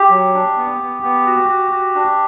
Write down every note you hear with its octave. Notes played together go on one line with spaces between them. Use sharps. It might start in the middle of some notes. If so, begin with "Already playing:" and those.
Already playing: G4
F#3
D4
B3
B3
B3
F#4
F#4
F#4
D4